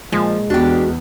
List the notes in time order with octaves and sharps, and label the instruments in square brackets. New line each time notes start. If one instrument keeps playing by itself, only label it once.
[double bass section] A#2 [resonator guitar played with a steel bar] F3 [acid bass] G#3
[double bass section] E2 B3 [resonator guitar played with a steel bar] D4 G4 [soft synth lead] F#4